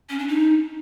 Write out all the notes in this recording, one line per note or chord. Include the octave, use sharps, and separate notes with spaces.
C#4
D4
D#4